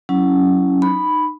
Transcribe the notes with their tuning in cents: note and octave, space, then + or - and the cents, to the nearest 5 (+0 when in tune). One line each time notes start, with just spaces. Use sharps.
F#3 +0 C#4 +0 E4 +0
D#4 -20 B5 +0